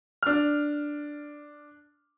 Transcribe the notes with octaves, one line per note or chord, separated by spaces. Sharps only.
D4 F6